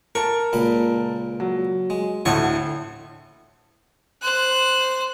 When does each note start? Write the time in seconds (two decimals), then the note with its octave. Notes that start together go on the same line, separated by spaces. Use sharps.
0.15 A#4 A5 C#6
0.53 C#2 A#2 B5
1.40 F#3
1.90 G#3
2.25 D2 A2 D3 C#5 D#5 C#6
4.22 C5 F#6